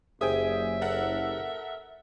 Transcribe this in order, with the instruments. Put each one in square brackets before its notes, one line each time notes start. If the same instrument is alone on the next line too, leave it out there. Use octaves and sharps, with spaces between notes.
[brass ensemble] F#1 [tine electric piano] G4 G#4 C5 [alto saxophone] E5 [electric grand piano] G5 G#5 D#6
[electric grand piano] A4 A#4 F#5